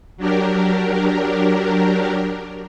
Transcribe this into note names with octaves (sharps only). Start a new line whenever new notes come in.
F#3 D4 G4 A#4